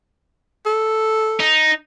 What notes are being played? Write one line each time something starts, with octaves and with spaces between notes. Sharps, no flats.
A4
D#4